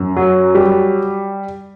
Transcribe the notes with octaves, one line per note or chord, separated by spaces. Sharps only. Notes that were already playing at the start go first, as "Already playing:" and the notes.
Already playing: F#2
F#3
G3